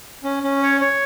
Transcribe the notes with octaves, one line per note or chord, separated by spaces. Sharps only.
C#4
C#4
C#5
C#5